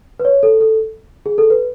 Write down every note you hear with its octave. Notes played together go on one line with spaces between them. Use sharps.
B4
C#5
A4
A4
G#4
A4
B4